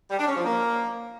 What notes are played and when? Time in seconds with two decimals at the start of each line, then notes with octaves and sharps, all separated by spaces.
0.11 G3
0.19 D4
0.28 C#4
0.36 F3
0.45 A#3